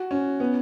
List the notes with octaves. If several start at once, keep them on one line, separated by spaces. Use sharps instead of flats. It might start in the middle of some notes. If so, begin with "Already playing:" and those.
Already playing: F#4
C#4
B3